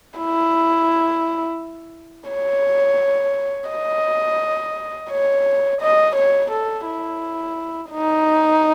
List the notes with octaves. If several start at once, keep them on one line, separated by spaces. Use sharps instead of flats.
E4
C#5
D#5
C#5
D#5
C#5
A4
E4
D#4